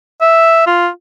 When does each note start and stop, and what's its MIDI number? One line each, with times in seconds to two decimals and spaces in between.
0.21 0.64 76
0.67 0.88 65